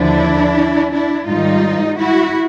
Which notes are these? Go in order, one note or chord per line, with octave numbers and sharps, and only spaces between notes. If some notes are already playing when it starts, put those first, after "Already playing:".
Already playing: D#2 D3 F3 D4 E4
D4 E4
G#2 D#3 G3 D#4 F4
E4 F#4